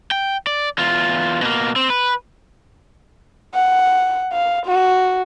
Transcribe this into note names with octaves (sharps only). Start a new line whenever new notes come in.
G5
D5
E2 F4
B2 A#3
C4
B4
F#5
F5
F#4